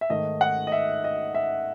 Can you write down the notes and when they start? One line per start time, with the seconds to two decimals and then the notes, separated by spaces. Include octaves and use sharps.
0.01 E5
0.09 G#2 D#3 A3 D#5
0.41 F#5
0.67 D#5
0.72 E5
1.04 D#5
1.35 E5